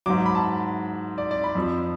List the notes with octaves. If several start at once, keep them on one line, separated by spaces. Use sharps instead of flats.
G#2 F#3 D6
B5
A5
D5
D5
B5
F2 F3